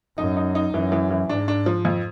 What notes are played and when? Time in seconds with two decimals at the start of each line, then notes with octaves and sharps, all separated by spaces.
0.18 F#2 D#4
0.37 D#4
0.55 D#4
0.74 F#2 E3
0.92 E3
1.11 E3
1.29 G#2 D4
1.48 D4
1.66 F3
1.85 F2